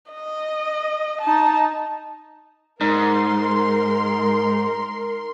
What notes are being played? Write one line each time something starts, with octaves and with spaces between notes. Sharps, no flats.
D#5
D#4 A5
G#2 D#4 A#4 C6